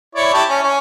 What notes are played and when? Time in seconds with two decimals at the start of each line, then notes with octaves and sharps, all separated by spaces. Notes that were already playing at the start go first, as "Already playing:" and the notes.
0.15 E4 C#5 D5
0.34 E4 G4 A5
0.48 C#4
0.63 C#4